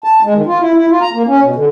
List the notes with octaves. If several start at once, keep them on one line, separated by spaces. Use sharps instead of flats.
A5
G#3
D#3
F4
E4
E4
F4
A#5
A#3
C#4
B2
D3